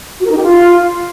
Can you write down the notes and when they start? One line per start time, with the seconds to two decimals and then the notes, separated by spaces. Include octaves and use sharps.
0.20 F#4
0.26 A#4
0.31 D#4
0.37 G4
0.43 F4